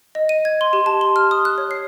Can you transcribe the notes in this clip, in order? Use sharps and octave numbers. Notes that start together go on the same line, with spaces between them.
D#5
D#7
G#6
C6
G4
A5
C6
F6
D#6
F#6
C#5
C7